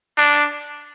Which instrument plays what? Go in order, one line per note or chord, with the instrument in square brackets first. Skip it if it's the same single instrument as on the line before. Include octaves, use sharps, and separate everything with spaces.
[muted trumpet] D4